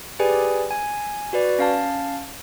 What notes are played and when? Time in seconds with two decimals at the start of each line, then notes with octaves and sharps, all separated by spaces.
0.19 G4 G#4 B4 D5 G#5
0.71 G#5
1.33 F#4 B4 D5
1.59 C#4 F5 A5